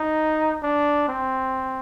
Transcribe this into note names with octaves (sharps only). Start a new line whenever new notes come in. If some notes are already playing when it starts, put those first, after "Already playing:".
Already playing: D#4
D4
C4